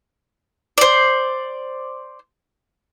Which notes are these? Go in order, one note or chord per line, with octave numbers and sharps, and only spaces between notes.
C5 D5